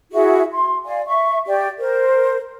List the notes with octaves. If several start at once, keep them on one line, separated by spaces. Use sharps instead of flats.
E4 F#4 G#4 E5
C6
D5 F5 G#5
E5 C#6
G4 D5
A#4 C5